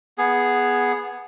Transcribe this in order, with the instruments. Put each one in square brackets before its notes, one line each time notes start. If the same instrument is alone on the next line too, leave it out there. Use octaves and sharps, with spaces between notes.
[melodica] B3 G#4